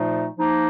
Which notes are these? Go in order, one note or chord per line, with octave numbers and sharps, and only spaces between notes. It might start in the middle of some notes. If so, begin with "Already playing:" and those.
Already playing: A#2 F3 A3 D#4
F3 A#3 D#4